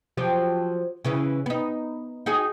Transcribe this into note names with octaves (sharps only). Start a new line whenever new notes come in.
F3 F#3 G4
C#3 E3 C#4
B3 D#4
D#4 F#4 G#4